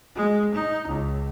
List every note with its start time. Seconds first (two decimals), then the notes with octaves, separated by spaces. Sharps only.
0.16 G#3
0.55 D#4
0.88 C#2